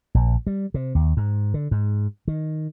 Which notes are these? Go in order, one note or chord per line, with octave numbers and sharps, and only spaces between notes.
A#1
G3
C3
D#2
G#2
D3
G#2
D#3